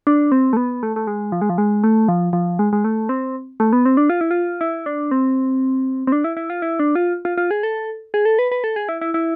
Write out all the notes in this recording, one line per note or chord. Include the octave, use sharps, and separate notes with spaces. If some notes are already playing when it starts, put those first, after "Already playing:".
D4
C4
A3
B3
A3
A3
G#3
F3
G#3
F3
G#3
A3
F3
F3
G#3
G#3
A3
C4
A3
B3
C4
D4
F4
E4
F4
E4
D4
C4
C4
D4
E4
E4
F4
E4
D4
F4
F4
F4
G#4
A4
G#4
A4
B4
B4
A4
G#4
E4
E4
E4